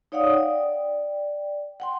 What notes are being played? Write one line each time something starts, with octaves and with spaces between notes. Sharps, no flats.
D#4 C#5 D5 F5 F#5 D#6
D5 G5
F#5 G5 C6